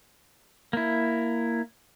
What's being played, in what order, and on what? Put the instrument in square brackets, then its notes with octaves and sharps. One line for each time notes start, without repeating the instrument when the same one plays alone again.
[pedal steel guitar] A#3 E4